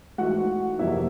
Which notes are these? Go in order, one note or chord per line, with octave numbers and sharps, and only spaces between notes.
G#2 E3 A3 F#4 F#5
F2 C3 E3 G3 A#3 E4 E5